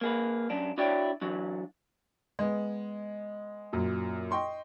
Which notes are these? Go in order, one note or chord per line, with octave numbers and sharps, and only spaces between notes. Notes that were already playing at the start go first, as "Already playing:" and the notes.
A#3 G#4 B4
F#2 D4
D4 E4 F#4 C#5 D5 G5
E3 F#3 D4
G#3 B3
F#2 A#2
D#5 G5 C6 C#6